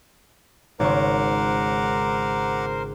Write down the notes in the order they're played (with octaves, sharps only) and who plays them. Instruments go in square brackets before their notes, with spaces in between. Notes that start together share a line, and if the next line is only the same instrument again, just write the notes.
[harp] G#1 C#3 C#6 [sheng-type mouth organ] A#4 C5 [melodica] F#5 A#5 D6